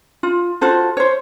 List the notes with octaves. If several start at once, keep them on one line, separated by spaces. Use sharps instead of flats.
F4
F4 F#4 A4 C5
C5 C#5